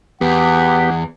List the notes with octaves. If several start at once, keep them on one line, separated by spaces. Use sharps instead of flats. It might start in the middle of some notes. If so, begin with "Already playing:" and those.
E2 B3 G4 F#5